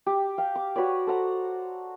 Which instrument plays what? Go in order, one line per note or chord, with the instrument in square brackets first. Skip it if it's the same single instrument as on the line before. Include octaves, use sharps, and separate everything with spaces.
[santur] G4
F5 G5
D6
F#4 B4 C#5 D5
A4 C5 F#5 A#5